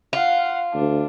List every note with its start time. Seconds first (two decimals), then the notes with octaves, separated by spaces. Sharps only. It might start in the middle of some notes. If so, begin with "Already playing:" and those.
0.13 F4 F5 F#5
0.74 D2 D4